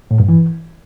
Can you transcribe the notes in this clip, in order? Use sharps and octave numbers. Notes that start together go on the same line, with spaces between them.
A2
G2
E3